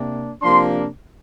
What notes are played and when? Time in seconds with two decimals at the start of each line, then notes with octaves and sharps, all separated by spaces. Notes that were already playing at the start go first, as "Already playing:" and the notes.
Already playing: C3 A#3 D4
0.42 C3 F3 A#3 D4 C6